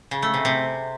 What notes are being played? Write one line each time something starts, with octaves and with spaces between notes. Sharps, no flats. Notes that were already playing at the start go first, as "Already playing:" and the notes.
C#3
A3
C3
C3